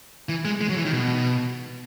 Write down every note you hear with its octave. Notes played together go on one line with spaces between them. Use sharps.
E3
G#3
G#3
F#3
E3
D#3
B2